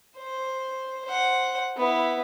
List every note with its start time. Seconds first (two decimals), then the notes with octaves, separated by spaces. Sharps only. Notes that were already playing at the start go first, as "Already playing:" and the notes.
0.17 C5
1.05 C5 F#5
1.77 B3 E4